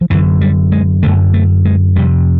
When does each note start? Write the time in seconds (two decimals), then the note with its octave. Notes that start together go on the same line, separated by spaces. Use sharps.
0.01 F3
0.10 F#2 D3 E3
0.41 G3
0.72 G#3
1.03 F#2 D3 A3
1.34 A3
1.65 G#3
1.96 F2 C3 G3